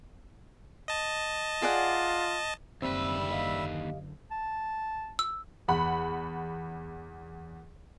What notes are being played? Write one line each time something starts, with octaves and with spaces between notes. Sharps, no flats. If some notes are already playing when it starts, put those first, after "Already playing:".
D#5 A5
F4 G#4 D5 F#5
F#1 D#2 D3 G3 C4 B4 E5 E6
G4 D#5 F5
A5
E6
E2 F#5 B5